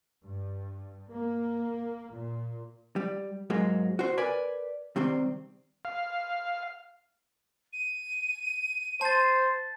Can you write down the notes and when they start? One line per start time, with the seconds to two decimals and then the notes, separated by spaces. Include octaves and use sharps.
0.24 G2
1.11 A#3
2.13 A#2
2.96 G3
3.50 G#2 F#3 G#3 A#3
3.99 F#4 C5
4.18 A#4 B4 D5 G#5
4.96 C3 D#3 G3 C4
5.85 F5
7.73 D#7
9.01 C5 A5 A6